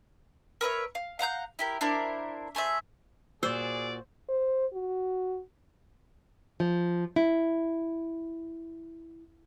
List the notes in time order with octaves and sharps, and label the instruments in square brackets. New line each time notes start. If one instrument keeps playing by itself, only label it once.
[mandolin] A#4 B4 C#5 E5
F5
F5 F#5 A#5 G6
E4 G4 A#4
D4 E4 A#4 C5
A3 G#4 C5 E5
[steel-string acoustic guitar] A#2 F#4 [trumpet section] G#4 D5 [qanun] C5 [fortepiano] E6
[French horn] C5
F#4
[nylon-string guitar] F3
E4